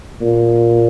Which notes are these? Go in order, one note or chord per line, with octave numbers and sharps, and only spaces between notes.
A#2